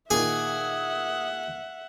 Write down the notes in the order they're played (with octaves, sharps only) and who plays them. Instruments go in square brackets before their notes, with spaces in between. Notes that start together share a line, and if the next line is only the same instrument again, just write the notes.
[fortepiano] A#2 D#3 [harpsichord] G#4 G#5 [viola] E5 F#5 [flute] D#6